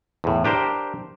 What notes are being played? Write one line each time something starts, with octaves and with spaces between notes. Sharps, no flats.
E2 A2
D4 G4 A#4 C5